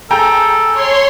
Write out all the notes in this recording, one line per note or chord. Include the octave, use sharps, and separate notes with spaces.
G#4 A4 G5 A#5
C#5 C6